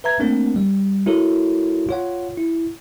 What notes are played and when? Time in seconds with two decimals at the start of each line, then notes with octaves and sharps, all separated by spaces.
0.04 B4 E5 A#5 G#6
0.19 A3 A#3 C4 D4 A#4
0.56 G3
1.06 G#3 E4 F#4 A4 A#4 C#5
1.89 F4 C#5 F#5
2.37 E4